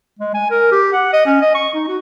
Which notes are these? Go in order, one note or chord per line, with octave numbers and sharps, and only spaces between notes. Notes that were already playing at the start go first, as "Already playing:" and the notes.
G#3
G#5
A#4
G4
F#5
D#5
C#4
D#5
C#6
D#4
F#4